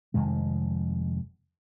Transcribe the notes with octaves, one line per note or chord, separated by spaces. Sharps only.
F1 F2 D#3 G#3